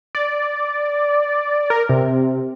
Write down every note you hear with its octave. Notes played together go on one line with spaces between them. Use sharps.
D5
A#4
C3